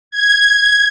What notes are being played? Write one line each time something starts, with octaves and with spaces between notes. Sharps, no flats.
G#6